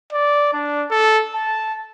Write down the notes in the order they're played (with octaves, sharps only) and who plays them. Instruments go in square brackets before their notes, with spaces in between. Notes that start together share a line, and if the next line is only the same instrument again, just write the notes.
[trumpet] D5
D4
A4
A5